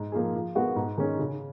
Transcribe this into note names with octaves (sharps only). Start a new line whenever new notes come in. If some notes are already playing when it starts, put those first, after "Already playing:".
Already playing: G#2
F3 A#3 F4 G#4
F3
G#3 B3 F#4 A#4
G#2
D#3 G#3 C#4
C#3